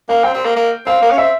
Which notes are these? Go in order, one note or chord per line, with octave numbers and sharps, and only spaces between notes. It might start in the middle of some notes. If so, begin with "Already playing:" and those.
A#3 F5
C4 G5
C4
A#3
A#3
C4 F5
A#3
C#4
C4 E5